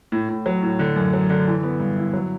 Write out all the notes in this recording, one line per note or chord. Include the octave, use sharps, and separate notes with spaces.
A2
A2
F#3
A2
D3
F#2
F#3
D3
E3
B3
G2
E4
F#3